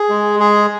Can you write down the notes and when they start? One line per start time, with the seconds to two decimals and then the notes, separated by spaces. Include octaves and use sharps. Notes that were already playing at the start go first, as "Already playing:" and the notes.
Already playing: G#4
0.09 G#3
0.40 G#4